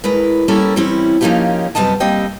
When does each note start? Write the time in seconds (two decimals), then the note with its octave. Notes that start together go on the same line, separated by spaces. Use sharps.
0.04 A2 G#3 A#4 B4
0.48 G3 A#3 C#4 E4 A4 A#4
0.76 E3 G3 C4 C#4 E4
1.21 F3 A#3 C#4 D#4 F4 G4
1.75 F#2 C3 G3 B3 D#5 A5
2.00 G3 A#3 C4 D#5 G5